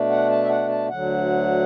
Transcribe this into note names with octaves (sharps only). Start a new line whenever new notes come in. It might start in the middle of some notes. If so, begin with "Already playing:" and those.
Already playing: B2 A3 D4
F#5
A5
E5
F#5
A5
D2 D3 F#3 F#5